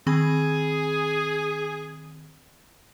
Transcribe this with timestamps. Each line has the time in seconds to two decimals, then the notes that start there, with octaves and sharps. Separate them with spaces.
0.07 D#3 C4 G#4 B5